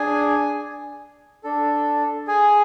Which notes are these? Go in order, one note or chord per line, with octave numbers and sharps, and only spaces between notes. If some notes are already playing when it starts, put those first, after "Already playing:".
Already playing: D4 G#4 G#5
D4 A4
G#4 G#5